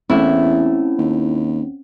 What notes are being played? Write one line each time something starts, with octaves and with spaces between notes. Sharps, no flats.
E2 A3 C4 C#4 E4
D#2